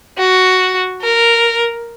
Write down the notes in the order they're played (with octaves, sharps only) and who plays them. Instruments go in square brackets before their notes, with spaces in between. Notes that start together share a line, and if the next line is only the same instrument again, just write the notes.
[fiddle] F#4
A#4